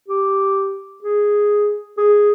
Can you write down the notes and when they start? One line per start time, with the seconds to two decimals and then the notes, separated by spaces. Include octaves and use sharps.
0.08 G4
1.03 G#4
1.98 G#4